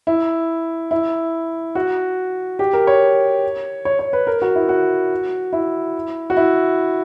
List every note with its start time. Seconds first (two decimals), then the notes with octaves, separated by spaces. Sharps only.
0.07 E4
0.91 E4
1.75 F#4
2.59 G4
2.73 A#4
2.87 C#5
3.85 C#5
3.99 C#5
4.13 B4
4.27 A#4
4.42 F#4
4.55 E4
4.69 F#4
5.53 E4
6.30 F#4
6.37 E4